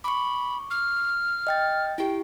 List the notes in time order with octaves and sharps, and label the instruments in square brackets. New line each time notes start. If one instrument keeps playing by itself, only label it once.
[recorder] B5 [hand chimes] C#6 D6
[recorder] F6
[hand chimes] D#5 G5 A6
[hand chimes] E4 G4 [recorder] G5